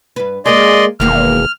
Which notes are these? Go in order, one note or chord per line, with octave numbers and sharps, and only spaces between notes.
G2 B4
G#3 A#3 G#4 D5 D#5 C6
E1 D#3 A#3 F#4 F6